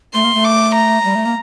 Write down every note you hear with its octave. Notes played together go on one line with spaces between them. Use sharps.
A3 C6
A#3
A3
D6
A#5
G3
A3
A#3